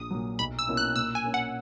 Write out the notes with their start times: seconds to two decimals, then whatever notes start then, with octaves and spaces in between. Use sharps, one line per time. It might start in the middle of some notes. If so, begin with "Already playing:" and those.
Already playing: A#1 D#6
0.11 A#2 F#3
0.39 B1 B5
0.59 E6
0.68 B2 A#3 C#4 E4
0.77 F#6
0.96 A#2 E6
1.15 G#5
1.25 A#3 C#4
1.34 F#5